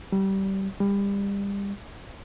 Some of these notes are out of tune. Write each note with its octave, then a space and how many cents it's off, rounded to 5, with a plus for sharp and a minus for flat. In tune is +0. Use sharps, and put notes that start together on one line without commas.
G3 -20
G3 +30